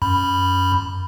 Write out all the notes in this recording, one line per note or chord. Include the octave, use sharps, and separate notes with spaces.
F#2 B5